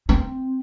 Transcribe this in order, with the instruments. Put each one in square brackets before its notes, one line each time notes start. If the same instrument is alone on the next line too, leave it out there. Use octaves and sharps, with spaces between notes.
[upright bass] C4